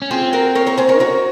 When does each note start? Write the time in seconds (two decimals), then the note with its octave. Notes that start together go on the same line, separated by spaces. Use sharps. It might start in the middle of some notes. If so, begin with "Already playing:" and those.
0.02 C#4
0.10 C4 F4 G#4
0.33 F#4 A#4
0.55 A#4 C#5
0.67 A#4 C#5
0.77 G#4 C5
0.89 A#4 C#5
1.00 F#4 A#4 C#5